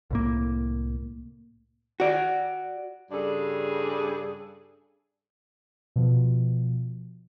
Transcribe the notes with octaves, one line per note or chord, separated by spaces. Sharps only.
C2 A2 A#3
F#4 D5
G2 C#3 D4 G#4 A4
B2 F3